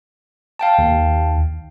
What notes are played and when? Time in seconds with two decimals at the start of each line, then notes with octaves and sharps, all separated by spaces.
0.59 F5 G5 A5
0.78 D#2